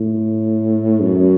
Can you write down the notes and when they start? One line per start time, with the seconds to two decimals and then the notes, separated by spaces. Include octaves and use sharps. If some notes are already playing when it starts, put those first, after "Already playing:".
Already playing: A2
1.01 F#2